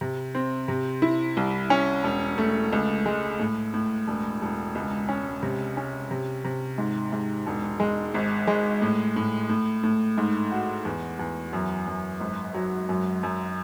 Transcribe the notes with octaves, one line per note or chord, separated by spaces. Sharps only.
C3
C4
C3
E4
C2
C#4
E1
A3
C#2
G#3
A2
A2
E1
E1
C#2
C#4
C3
C#4
C3
C3
G#2
G#2
E1
G#3
G#1
G#3
A2
A2
A2
A2
G#2
F#4
E2
E2
F#2
F#2
G#1
F#3
F#2
F#2